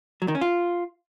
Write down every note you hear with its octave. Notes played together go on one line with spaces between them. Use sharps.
F#3
D#3
C#4
F4